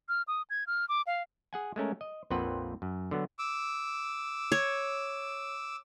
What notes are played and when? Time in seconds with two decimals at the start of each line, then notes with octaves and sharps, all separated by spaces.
0.09 F6
0.28 D#6
0.50 G#6
0.67 F6
0.89 D6
1.07 F5
1.53 G#4 F#5 G#5
1.76 G#3 A3 C#4 A#4
2.01 D#5
2.30 A#1 F2 A#2 C4 B4 F#5
2.82 F#2
3.11 D3 F#3 B3
3.39 D6 E6
4.52 C#5